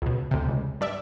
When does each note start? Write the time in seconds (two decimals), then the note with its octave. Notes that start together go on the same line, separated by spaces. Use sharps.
0.02 C#2 B2
0.31 D2 C3
0.49 C#2
0.81 G2 D5 E5